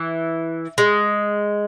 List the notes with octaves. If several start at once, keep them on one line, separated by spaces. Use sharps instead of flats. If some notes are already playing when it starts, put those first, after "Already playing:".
Already playing: E3
G#3